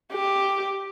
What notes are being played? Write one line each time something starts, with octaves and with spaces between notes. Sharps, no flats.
G4